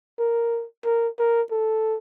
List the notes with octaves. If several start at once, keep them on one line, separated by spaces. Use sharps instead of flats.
A#4
A#4
A#4
A4